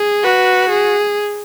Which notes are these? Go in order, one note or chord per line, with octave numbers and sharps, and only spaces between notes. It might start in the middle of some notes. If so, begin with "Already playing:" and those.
Already playing: G#4
F#4 B4
G#4